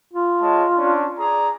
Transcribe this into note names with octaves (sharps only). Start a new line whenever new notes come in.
F4
G#3 C#5 A5
C#4 D4
G#4 D5 A#5